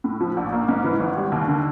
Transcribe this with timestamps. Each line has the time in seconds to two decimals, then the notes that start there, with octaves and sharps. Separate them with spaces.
0.04 A2
0.21 F3
0.37 A#1
0.53 A#3
0.69 G#2
0.84 E3
1.00 G#1
1.16 G3
1.32 D#2
1.48 D3